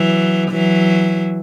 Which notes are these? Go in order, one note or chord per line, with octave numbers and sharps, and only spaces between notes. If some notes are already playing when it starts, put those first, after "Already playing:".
Already playing: E3 F#3
E3 F#3